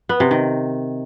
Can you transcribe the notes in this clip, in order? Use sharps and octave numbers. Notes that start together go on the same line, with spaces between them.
B3
C3
D#3